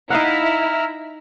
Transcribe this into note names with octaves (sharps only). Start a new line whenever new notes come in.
D#4 E4 F5 F#5 A#5 E6 F6